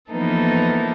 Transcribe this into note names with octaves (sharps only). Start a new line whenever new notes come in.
E3 F3 A#3 B3 D#4 A4